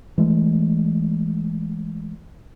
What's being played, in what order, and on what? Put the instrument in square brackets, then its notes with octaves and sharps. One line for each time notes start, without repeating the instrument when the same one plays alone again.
[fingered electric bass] E3 G#3 A3